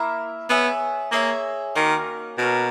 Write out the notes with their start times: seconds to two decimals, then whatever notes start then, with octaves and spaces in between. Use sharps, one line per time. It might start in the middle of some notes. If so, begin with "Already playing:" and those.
Already playing: A#3 E4 A#4 E5
0.49 B3 G#4 C#5 E5 G#5
1.12 A#3 G#4 C#5 E5 G#5
1.75 D#3 A#3 C#4 F#4 A#4
2.38 B2 A#3 C#4 F#4 A#4